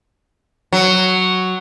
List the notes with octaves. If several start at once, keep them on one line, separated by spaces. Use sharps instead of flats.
F#3